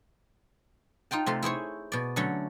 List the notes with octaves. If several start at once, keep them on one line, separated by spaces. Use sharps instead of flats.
D#4 F4 G5 A5
C3 A3 F4 C6
E4 G#4 C5 C#5
B2 D5
D3 F#3 A3 C#4